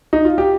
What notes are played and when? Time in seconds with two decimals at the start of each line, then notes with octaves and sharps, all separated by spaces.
0.13 D#4
0.25 F4
0.38 G4